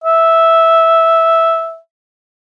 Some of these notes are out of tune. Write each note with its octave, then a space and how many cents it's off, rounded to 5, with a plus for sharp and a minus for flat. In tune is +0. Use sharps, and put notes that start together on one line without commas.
E5 -5